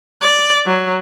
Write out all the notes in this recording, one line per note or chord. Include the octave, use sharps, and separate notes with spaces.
D5
F#3